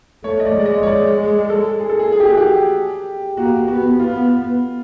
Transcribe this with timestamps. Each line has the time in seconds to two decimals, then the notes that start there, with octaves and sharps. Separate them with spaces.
0.24 A3 C#5
0.40 D#5
0.45 D5
0.56 G#3 D5
0.66 D#5
0.83 C#5
0.86 G#3 D5
1.50 A4
1.80 G#4
1.89 A4
1.99 G#4
2.12 G#4
2.20 G4
2.29 F#4
2.37 G4
3.37 A#3 F#4
3.68 B3 F#4
4.00 B3 F4